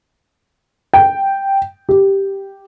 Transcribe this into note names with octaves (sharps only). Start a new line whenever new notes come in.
G5
G4